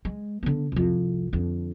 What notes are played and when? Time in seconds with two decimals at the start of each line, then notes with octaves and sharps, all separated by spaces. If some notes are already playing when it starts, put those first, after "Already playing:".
0.05 G#3
0.43 D3 B3
0.72 C2 F2
1.33 F2 D3